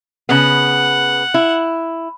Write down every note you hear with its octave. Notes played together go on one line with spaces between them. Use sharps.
C#3 B3 F#5
E4